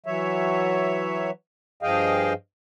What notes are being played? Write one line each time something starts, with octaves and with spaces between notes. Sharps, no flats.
E3 F#3 C#5 E5
G2 F3 G#4 D#5 F5 G5